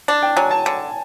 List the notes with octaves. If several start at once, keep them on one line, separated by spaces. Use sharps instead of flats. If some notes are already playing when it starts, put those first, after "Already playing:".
D4 A5
G5
F#3 G#5
A5
D3